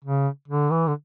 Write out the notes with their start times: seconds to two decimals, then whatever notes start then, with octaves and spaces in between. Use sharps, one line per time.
0.05 C#3
0.48 D3
0.71 E3
0.87 D3